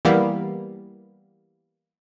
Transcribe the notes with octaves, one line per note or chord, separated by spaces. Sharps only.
E3 G3 A#3 B3